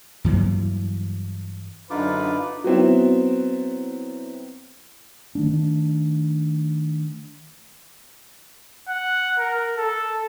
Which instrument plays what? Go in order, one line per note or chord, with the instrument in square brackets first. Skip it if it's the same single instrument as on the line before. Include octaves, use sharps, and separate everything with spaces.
[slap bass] G2 E3 F#3 A#3
[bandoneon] F#2 D3 F4 [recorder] D4 [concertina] D#4 D6 [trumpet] B4
[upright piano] F#3 B3 C4 E4
[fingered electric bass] D#3 A3 D4
[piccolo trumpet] F#5
A#4
A4